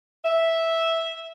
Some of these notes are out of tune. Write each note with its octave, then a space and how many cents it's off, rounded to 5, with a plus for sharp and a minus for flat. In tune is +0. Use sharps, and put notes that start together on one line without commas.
E5 -5